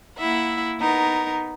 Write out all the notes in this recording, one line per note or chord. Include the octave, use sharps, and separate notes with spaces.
A#3 E4 E5 F#5
B3 D#4 A#4